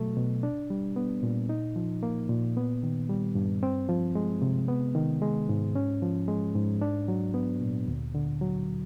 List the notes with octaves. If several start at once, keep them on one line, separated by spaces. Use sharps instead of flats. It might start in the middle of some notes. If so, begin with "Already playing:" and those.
Already playing: B2 F#3 A3
B2
D4
G3
B3
A#2
D#4
F3
A#3
A#2
B3
D#3
G3
G2
C4
F3
G#3
C3
B3
D#3
G#3
G#2
C#4
F3
G#3
G#2
D4
F#3
B3
A#2
D2
D3
F#3